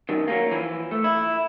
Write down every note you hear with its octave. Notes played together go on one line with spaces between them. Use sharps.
F#2 D#3
F#3 A3 A#3
E3 F3
A3
E4